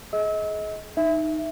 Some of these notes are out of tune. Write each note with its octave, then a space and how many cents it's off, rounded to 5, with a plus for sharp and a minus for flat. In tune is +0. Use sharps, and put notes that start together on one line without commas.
G#4 +30 D#5 +30 E6 -30
D#4 +0 E5 +0